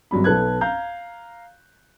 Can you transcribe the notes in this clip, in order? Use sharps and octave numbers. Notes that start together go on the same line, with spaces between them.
G#1 F#3 G3 B5
B1 B3 A4 B4 F#6 G#6
F5 A#5 G6